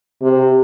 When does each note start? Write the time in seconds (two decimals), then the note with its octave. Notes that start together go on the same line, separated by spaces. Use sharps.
0.22 C3